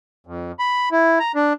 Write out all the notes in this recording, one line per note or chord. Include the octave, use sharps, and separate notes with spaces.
F2
B5
E4
A#5
D4